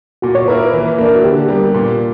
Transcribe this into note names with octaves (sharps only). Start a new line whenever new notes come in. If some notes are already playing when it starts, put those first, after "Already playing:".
A#2 F#4
C#5
A#3 E4 A#4 B4
B4
E3 B4
A#3 D4 A#4
F#4
D3 G4
G3 B3 A#4
A#2